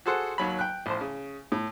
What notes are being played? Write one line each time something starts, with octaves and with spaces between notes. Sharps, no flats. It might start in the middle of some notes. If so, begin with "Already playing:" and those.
F#4 G#4 A4 C5 F#5
D#2 F#3 B5
G5 F#6
A1 F3 C5
C#3
A2